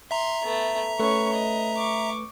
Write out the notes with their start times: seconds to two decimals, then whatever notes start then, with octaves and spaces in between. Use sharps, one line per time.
0.11 E5 A#5 C6
0.43 A3 B3
1.00 A3 C#4 A4 B4 C#6
1.33 D#5
1.76 C#6 D6